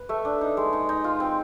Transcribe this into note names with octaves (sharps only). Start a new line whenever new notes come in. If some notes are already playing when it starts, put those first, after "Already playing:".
Already playing: B4
A3 E5
D4
D#4
G#3
D#4
D#4
F4
C4